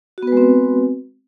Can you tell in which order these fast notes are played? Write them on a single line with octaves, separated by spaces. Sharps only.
F#4 B3 B4 G#3 C4